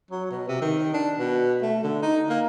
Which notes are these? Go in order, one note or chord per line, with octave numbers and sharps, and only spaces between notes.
F#3
B2
C3
D#3
D4
B2
A3
D3
D#4
A#3